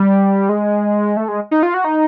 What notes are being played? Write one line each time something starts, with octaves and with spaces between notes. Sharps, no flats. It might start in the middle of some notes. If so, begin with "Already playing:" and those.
Already playing: G3
G#3
A3
G#3
D#4
F4
F#4
D#4